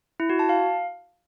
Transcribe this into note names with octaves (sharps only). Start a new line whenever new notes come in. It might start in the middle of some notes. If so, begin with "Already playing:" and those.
E4
F#4
A5
F5